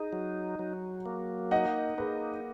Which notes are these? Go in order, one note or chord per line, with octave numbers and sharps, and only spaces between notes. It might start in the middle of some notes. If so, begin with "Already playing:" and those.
Already playing: D#4 G#4
F#3
F#3
A#3
D#4 D#5 F#5
A#3 G#4 B4